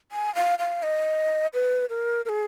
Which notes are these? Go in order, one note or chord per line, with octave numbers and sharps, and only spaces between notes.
G#5
F5
F5
D#5
B4
A#4
A#4
G#4